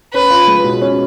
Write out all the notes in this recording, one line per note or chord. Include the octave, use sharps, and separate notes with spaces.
C#4 B4
F4
G#3
B2
C#4